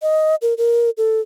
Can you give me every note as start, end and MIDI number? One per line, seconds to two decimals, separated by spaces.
0.02 0.35 75
0.42 0.54 70
0.58 0.90 70
0.98 1.21 69